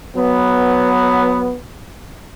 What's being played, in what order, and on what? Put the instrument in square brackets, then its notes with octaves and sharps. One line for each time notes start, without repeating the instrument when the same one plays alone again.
[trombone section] F#3 B3